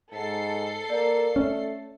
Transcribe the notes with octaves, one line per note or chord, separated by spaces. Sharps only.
G#2 A4 C7
A#3 D5
A3 C#4